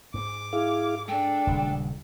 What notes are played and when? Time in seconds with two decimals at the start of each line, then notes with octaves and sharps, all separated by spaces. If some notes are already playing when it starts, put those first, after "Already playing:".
0.14 G#2 D6
0.53 E4 G#4 F5
1.08 G#3 D4 A4 G5
1.47 D#1 C#3 G3